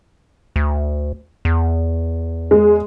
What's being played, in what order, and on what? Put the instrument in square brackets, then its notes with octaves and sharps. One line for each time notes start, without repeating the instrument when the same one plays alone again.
[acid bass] D2
E2
[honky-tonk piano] G#3